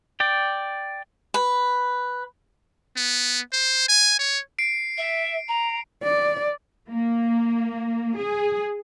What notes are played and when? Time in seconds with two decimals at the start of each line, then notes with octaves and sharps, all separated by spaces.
0.20 D5 G5
1.34 B4
2.96 B3
3.53 C5
3.88 G#5
4.19 C#5
4.59 C7 D7
4.97 E5
5.48 A#5
6.03 D5
6.90 A#3
8.17 G#4